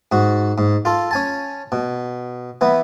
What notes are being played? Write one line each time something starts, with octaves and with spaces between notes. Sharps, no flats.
G#2 F#4
G#2
F4 A4
C#4 G#5 A5
B2
E3 B3